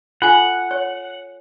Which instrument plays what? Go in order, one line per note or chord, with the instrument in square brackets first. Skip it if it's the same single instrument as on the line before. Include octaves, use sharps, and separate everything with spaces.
[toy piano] F4 A4 G#5 [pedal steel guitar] F#5
[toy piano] C#5